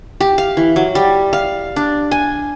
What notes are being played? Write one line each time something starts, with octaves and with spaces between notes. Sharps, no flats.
G4
F5
E3
F#3
G3
F5
D4
G#5